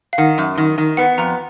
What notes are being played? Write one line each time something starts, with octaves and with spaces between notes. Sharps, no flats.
F5
D#3 F#5
F#2
D#3
D#3
B3 F#5
F2 A#5